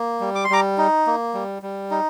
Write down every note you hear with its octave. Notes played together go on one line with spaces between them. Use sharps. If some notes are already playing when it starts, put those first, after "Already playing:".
Already playing: A#3
G3
D6
C6
G3 A#5 D6
D#4
A#3
G3
G3
D#4